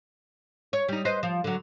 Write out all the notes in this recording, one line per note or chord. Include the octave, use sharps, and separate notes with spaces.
C#5
G3 D#4
B4 C5 D#5
F3
D3 F#3